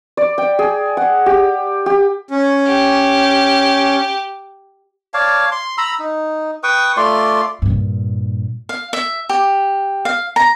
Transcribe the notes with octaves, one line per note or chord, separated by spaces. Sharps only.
D5
G5
G#4
F#5
G4
G4
C#4
G4
C#5 D5 F5 A5
C6
A#5 B5 E6
D#4
B4 G5 C#6 D#6
A3 F4 D5 C6
G2 A#2
F5
E5
G4
F5
A#5